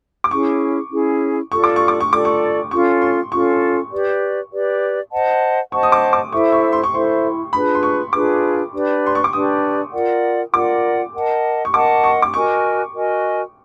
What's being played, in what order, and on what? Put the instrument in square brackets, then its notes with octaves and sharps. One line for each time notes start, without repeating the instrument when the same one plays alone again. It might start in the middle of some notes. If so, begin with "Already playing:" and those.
[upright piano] D6
[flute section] C#4 E4 G#4 [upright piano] C#6
[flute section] C#4 E4 G#4
[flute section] F4 A4 D5 [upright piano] C#6
[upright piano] D6
C#6
D6
C#6
[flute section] F4 A4 D5 [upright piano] D6
[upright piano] C#6
[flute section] C#4 F4 A4 [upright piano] C#6
[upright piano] C6
[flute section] C#4 F4 A4 [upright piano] C#6
[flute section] G4 B4 D5
G4 B4 D5
C5 D#5 F#5 A5
[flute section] C5 D#5 F#5 A5 [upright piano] C#6
[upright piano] D#6
D6
D6
[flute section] E4 A4 C5 E5 [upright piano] C#6
[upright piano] C#6
C6
C#6
[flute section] E4 A4 C5 E5 [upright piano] C6
[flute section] D4 F4 G#4 B4 [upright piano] B5
[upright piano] C6
C#6
[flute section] D4 F4 G#4 B4 [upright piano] D6
[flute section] D4 G4 B4 D5
[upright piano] C6
C#6
D6
[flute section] D4 G4 B4 D5 [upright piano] D#6
[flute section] F4 A#4 D5 F#5
[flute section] F4 A#4 D5 F#5 [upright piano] D6
[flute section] A#4 D#5 F#5 A5
[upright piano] C#6
[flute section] A#4 D#5 F#5 A5 [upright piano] D6
[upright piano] C#6
D6
[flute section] F#4 A#4 D#5 G#5 [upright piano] C#6
[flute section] F#4 A#4 D#5 G#5